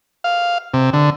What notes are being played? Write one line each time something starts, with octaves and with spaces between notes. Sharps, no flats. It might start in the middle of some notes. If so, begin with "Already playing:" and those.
F5
C3
D3